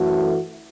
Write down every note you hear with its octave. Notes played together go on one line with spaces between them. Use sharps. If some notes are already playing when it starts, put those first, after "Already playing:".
Already playing: F#2 E3 A3 F#4 A4